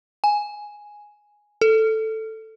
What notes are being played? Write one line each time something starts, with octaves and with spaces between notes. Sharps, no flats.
G#5
A4